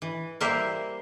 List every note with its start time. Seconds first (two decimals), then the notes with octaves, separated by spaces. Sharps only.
0.02 E3
0.40 G3 A#3 A#4 C5 E5